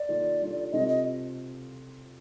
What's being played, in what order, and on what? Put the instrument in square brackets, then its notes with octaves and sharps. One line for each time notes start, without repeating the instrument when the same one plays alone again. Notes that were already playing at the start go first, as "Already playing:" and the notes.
Already playing: [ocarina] D5
[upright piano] D#3 A#3 F4 A4
G3 D4 F4 A4
[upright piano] C3 G3 C4 F4 A4 [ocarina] D#5
[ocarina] D#5